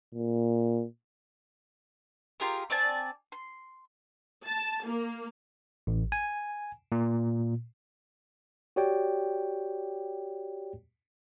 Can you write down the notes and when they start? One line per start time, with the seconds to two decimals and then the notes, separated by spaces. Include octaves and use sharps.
0.14 A#2
2.40 F4 G4 G#4 A#4
2.70 C4 D5 G#5 A5
3.32 C6
4.44 A5
4.85 A#3
5.87 A1
6.12 G#5
6.92 A#2
8.76 F#4 G4 C#5 D5 G5